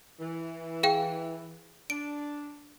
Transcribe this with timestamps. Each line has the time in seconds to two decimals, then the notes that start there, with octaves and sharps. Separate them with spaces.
0.19 E3
0.83 G#4 F5 G5
1.90 D4 D7